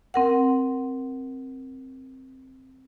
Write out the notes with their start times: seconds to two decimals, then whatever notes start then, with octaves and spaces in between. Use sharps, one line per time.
0.14 C4 A#4 F#5